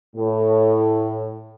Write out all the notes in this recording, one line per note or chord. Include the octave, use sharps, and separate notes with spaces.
A2